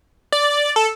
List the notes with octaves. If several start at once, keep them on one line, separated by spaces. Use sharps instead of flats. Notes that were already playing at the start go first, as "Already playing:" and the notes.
D5
A4